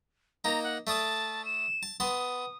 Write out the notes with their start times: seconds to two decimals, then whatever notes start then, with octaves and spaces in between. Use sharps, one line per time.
0.44 A#3 D#4 A#5
0.64 F#5
0.87 A3 D5 A5 D#6
1.45 E7
1.83 A5
2.00 B3 A5 C6 D#6